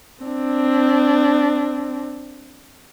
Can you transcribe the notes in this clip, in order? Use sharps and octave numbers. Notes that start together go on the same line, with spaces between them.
C4 D4